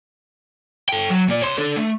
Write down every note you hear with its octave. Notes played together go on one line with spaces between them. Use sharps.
A4 G5
F#3
A#2 D5
C#5 C6
D4 A4
A3